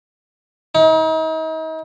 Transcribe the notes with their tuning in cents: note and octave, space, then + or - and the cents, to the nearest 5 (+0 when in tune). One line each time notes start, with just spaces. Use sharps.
D#4 +40